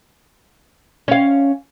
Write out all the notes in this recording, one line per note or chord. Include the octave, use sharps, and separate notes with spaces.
C#4 F5